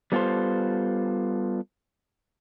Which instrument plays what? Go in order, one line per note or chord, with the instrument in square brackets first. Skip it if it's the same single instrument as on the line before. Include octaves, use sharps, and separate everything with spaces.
[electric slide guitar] G3 B3 F4 F#4 A4 C5